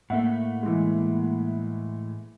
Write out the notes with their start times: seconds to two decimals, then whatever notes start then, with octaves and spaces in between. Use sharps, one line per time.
0.10 A2 A3 A#3 E5 F#5
0.63 E3 G#3